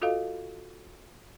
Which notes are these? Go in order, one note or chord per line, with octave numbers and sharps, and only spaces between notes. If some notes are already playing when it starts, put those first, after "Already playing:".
F4 F#4 A4 D#5 F5